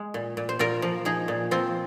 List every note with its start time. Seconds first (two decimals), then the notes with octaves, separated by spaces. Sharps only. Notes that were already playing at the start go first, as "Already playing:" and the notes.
Already playing: G#3
0.14 A#2
0.37 A#2
0.49 C5
0.59 A#2 F4 A#4
0.82 F3
1.05 F3 D#4 G#4
1.28 A#2
1.51 F3 C4 F4